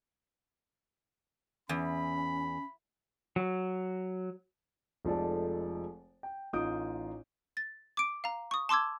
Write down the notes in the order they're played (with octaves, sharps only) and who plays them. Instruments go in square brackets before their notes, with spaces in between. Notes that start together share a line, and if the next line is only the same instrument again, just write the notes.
[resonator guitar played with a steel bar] E2 [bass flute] C#4 [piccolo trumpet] B5
[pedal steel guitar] F#3
[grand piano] F1 F3 G#3 A4 D5 A5
G5
A1 D#4 F4 D#6 G6 D7
[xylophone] A6
D6 D7
F5 A#5
C#6 D#6
A5 C6 D6 E6 G#6